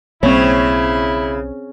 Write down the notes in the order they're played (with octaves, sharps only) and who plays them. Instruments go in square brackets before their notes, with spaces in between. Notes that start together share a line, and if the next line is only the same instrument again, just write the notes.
[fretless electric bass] B1 G3 A#3 [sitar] C#3 [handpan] C4 C#5 [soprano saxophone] E4